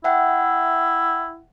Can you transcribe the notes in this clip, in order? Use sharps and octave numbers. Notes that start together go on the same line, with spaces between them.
E4 E5 F#5 G5